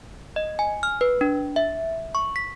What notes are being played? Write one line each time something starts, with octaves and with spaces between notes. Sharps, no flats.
D#5
G#5
F6
B4
D4
E5
C#6
B6